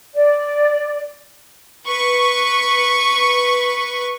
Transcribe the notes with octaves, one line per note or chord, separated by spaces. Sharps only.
D5
B4 C#6